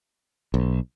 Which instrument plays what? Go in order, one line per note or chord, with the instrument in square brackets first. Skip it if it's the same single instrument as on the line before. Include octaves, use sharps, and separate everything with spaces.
[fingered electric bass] B1